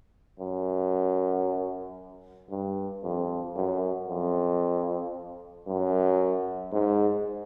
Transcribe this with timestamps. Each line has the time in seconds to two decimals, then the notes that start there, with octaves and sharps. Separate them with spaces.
0.39 F#2
2.50 G2
3.04 F2
3.56 F#2
4.09 F2
5.67 F#2
6.73 G#2